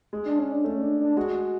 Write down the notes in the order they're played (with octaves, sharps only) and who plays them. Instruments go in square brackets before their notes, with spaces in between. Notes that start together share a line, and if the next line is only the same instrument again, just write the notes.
[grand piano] G#3
[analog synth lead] D4
C#4
D4
[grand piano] A3 [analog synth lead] C#4
[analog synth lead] D4
D4
[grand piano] G#3 [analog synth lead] F#4